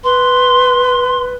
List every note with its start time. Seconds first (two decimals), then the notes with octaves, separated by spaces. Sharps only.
0.04 B4 C6